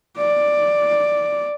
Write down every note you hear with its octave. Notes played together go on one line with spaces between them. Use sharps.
D5